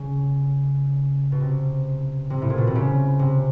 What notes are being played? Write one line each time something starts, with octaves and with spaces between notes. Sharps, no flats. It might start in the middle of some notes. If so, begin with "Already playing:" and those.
Already playing: C#3
B2
C3
C3
A2
A#2
B2
C3
C#3
C3